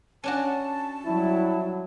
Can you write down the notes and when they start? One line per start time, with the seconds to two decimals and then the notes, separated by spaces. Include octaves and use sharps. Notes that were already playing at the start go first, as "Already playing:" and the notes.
0.24 C#4 D4 F#4 A5
1.06 F#3 G3 E4